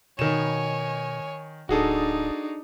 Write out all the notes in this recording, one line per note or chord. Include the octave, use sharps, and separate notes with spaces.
B2 D#3 C#5 G#5 E7
D1 D4 D#4 F#4 G#4 A4